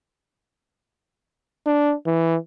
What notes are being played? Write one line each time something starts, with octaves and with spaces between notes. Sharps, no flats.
D4
E3